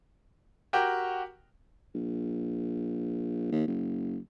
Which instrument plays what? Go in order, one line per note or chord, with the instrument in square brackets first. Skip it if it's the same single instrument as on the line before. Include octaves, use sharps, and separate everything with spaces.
[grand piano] F#4 G4 A#4 G5
[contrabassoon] A#1
D#2
F#1